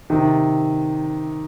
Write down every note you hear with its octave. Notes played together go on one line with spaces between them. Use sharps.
C3 D#3